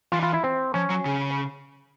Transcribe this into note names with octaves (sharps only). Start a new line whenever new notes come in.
E3 F4
F4
E4
C4
F3 C#4
F#3
C#3